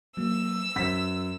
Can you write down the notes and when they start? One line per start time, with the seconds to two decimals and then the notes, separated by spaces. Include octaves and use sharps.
0.17 F#3 A#3 E6
0.76 F#2 C5 F#5 B6